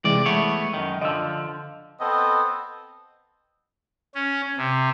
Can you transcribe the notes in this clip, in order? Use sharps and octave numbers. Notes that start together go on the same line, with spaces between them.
C3 E3 G#3 D5
A3 B3 C#5
F#2 D#3
D3 F3 D#5 E6
B3 C4 A4 D#5
C#4
C3